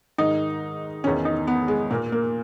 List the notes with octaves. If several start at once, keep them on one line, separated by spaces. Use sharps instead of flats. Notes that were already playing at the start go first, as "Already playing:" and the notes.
G#2 D#3 D#4
E2 D#3 C#4
D#4
B3
G#3
A#2 A#3
A#3